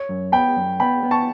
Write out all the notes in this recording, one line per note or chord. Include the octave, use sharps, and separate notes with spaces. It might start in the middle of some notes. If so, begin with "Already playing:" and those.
Already playing: C#5
F#2
B3 G5 B5
F#2
B3 G5 B5
B3
A5 C#6